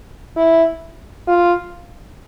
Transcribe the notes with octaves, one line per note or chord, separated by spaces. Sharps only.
E4
F4